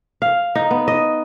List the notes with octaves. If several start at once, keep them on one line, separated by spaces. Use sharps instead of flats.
F5
D#4
B3
D#5